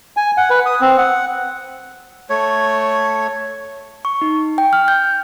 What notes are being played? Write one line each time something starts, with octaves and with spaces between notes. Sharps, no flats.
G#5
F#5
B4
D#6
C4
F#5
A3 C#5
C#6
D#4
G5
F6
G6